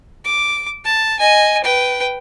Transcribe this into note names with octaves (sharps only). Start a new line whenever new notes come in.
D6
A5
D#5 G#5
B4 G5